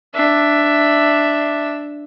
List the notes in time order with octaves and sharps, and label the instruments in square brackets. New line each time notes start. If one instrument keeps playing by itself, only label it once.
[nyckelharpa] D4 E5